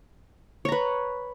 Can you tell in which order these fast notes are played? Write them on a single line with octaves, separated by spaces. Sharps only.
C#5 A#5 B4